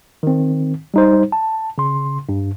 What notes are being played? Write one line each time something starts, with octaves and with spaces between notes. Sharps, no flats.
D#3 C4
G3 D#4 C5
A5
C#3 C6
G2